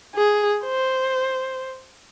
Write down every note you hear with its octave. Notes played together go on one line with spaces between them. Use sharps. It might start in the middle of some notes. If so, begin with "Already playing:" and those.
G#4
C5